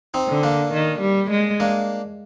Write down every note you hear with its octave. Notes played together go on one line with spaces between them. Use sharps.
C4 D#4
D3
A#3 D4
D#3
G3
G#3
A#3 D4